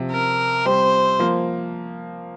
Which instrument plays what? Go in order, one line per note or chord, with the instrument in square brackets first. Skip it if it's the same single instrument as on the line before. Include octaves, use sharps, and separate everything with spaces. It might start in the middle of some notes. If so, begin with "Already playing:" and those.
Already playing: [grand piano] C3 F3
[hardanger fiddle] A#4
[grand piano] G3 C4 [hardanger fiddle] C5
[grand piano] F3 A#3